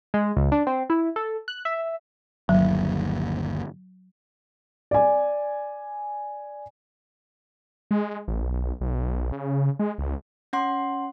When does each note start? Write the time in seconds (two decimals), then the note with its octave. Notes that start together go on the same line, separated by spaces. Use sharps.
0.14 G#3
0.37 C#2
0.52 D4
0.67 C4
0.90 E4
1.16 A4
1.48 F#6
1.65 E5
2.49 G1 D#2 F#3
4.91 D5 G#5
7.91 G#3
8.28 A1
8.42 B1
8.81 B1
9.32 C#3
9.79 G#3
9.98 C#2
10.53 C#4 F#5 C6